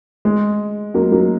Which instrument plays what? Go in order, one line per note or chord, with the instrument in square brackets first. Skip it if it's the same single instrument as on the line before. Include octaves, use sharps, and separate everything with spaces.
[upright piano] G#3
F#3 A#3
F#3 A#3